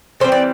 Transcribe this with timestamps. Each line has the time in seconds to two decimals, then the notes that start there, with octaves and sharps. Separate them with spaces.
0.20 E3 G3 C4 C5
0.32 D5